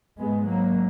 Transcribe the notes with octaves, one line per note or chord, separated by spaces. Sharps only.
G#2 G#3 B3
F#3 A#3